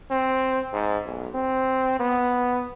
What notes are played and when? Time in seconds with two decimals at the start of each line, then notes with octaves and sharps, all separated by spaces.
0.11 C4
0.73 G#2
1.05 B1
1.34 C4
2.00 B3